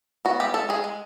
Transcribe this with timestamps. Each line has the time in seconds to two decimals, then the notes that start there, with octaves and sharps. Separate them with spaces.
0.25 B3 F#4
0.40 G#3 G4
0.54 G#3 A4
0.69 G#3 G#4
0.84 G#3